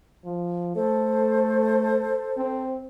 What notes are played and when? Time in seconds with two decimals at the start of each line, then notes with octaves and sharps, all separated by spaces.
0.25 F3
0.75 A3 A4 C5
2.37 C4